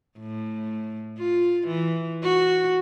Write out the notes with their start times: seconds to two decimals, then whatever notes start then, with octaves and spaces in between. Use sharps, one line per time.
0.19 A2
1.18 F4
1.67 E3
2.22 F#4